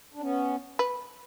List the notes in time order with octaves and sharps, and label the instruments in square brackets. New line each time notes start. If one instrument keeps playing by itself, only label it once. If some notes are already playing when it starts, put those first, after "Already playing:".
[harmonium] D4
B3 C#4
[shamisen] B4